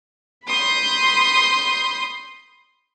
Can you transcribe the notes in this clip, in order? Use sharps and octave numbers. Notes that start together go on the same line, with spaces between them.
B5 C6 D#6 G6